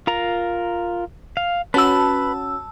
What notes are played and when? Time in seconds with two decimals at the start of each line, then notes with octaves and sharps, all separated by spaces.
0.07 F4 A#4 A#5
1.37 F5
1.74 C#4 F#4 B4 A5 B5 E6